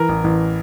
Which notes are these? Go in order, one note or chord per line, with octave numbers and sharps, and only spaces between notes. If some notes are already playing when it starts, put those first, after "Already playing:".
Already playing: E3 A#4
A1
A1